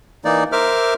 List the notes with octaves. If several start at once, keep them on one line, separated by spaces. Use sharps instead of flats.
E3 A#3 D#4 D5
A#4 C5 E5 D6 F6